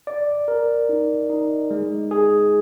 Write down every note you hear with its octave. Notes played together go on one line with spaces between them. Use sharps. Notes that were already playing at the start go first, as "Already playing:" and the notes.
D5
A#4
D#4
D#4
G#3
G#4